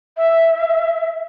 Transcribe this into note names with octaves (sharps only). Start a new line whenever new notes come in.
E5